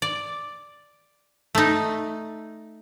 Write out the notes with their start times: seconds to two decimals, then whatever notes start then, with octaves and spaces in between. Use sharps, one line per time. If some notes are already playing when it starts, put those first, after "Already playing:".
0.02 D5
1.55 A3 D#4